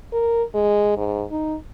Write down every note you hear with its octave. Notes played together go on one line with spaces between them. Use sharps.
A#4
G#3
G#2
D#4